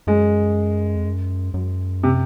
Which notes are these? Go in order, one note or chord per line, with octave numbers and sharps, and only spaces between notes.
F#2 G#3
F2
F#2
F#2
C3